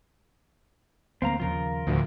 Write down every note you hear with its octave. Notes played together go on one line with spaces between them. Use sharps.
D2 A3 A#3 C4 F5 A#5
D#2 C#3 F3 F4 A#4
D2 A2 F3